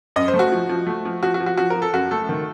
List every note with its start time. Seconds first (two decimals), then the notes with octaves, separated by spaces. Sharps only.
0.16 F#2 D#5
0.28 C5
0.34 A3
0.39 F#4
0.52 F3
0.69 F3
0.87 A3
1.05 F3
1.23 F3 F#4
1.34 F#4
1.40 F3
1.46 F#4
1.57 F3 F#4
1.70 F3 A#4
1.82 A4
1.93 F#2 F#4
2.11 A3 A4
2.29 D#3